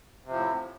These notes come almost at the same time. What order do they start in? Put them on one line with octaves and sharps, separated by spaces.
C3 F3 A2